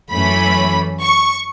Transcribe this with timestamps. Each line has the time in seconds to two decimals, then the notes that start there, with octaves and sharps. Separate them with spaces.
0.12 F#2 E3 A3 C#4 B5
1.01 C#6